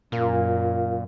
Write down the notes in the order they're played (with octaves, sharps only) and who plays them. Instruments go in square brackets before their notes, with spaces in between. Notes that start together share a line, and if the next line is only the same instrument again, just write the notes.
[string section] F#2 [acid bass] A#2 [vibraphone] F4 A#4 F5